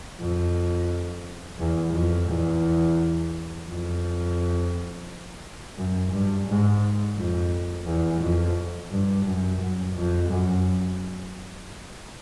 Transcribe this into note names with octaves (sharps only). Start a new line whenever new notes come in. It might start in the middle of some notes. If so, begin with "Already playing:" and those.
F2
E2
F2
E2
F2
F#2
G2
G#2
F2
E2
F2
G2
F#2
F#2
F2
F#2